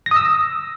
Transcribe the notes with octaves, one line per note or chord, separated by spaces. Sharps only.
A#6
D#6
E6